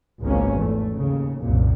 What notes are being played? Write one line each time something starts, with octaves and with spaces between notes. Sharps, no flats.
G#1 C#2 G#2 B2 A#3 C#4
E2 A3
D#2 C#3
F#1 C2 F#2 A#2